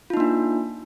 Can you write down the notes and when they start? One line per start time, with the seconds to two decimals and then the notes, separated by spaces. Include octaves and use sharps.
0.10 F4
0.14 D#4
0.17 A#3
0.20 D4